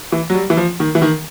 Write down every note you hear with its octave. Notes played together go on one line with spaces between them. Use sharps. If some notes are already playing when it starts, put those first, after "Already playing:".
E3
F#3
G3
E3
F3
D#3
E3
D#3